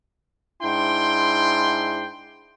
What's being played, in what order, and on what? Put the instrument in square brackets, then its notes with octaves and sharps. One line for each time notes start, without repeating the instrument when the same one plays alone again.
[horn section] G#2 D4 E4 G5 C6